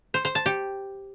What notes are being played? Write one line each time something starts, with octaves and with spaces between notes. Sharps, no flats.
C5
C5
A5
G4